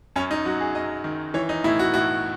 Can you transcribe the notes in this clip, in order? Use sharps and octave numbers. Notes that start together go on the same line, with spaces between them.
F#2 C#4
D#4
F#3 F#4
G#4
F#2 D#5
D#3
E3 C#5
D#4
A2 E4
F#4
A2 F#4